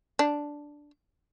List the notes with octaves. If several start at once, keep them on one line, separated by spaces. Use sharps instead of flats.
D4